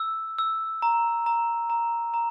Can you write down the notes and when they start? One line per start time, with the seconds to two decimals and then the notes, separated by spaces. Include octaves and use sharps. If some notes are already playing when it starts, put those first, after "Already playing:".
Already playing: E6
0.39 E6
0.82 A#5
1.26 A#5
1.70 A#5
2.14 A#5